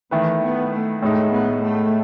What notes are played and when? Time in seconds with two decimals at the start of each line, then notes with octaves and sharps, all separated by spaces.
0.11 D#3 E3 A3 E4 B4
0.42 B3
0.72 A3
1.02 A2 G#3 A3 D#4
1.32 B3
1.63 A3